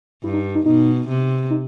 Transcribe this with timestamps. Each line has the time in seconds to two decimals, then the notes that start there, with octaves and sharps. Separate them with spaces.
0.23 G2 E4
0.33 D#4
0.55 D#4
0.66 B2 D#4
1.08 C3
1.50 D#4